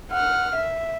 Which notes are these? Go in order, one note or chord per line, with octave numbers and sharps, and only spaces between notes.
F#5 F6
E5